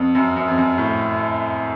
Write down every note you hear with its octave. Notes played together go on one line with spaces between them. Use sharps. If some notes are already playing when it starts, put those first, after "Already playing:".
Already playing: F2
F#2
F#2
F2
F#2
A2